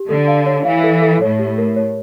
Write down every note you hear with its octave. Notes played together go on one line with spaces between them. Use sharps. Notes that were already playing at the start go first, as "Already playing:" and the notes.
Already playing: G4
D3 A4
F5
C#5
E3 F5
A4
A4
A2 C#5
G4
A#4
C#5